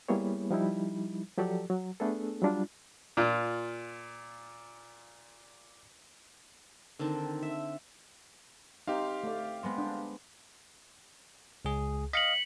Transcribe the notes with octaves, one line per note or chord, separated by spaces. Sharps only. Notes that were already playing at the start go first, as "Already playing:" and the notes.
G3 A#3 B3 E4 G#4 C#5
F3 G3 D#4 E4
F3 F#3 G4 A4 D5
F#3
A3 B3 D4 G#4 A4
F#3 G3 D4 F4
A#2 F4
D3 D#3 C4 A5
E5
C4 D#4 G4 F5
A3 D5
G#3 B3 C4
D4
C#2 G#4
D#5 F5 B6 C#7 F#7